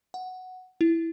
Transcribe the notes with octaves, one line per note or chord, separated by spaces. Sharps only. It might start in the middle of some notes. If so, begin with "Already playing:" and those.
F#5
E4